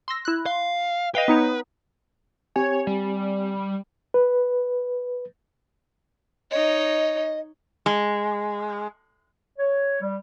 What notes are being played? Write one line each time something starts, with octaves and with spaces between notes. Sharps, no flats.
C6 E6 A#6
E4 F#6
F5 C6
B4 D#5 F5 G5
B3 D#4 C#5
C4 G4 C#5 G#5
G3
B4
D#4 C#5 D#5
G#3
C#5
G3